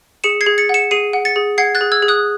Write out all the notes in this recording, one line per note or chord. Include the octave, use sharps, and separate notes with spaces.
G#4 C#7 E7
G#6 C7
G#4
A6 C#7
F#5 C#7 E7
G#4 C7 D#7
F#5
A6 C#7
G#4
F#5 G#6 C7
F#6 A6
G#4
E6 G#6
G#4
D#6 F#6